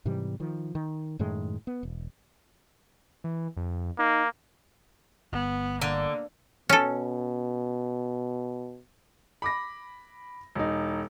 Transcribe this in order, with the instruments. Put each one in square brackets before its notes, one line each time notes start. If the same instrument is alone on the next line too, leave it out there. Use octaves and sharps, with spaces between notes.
[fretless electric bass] G#2 C3 E3 G3
D#3 F3
D#3
F#2 A2 D#3 G#3
B3
E1
[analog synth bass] E3
F2
[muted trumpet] A#3 [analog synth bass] D#4
[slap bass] G1 [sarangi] B3
[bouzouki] D3 [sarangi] A#3
[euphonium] B2 [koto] C#4 A4
[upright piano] B5 D6 A#6
E1 D#4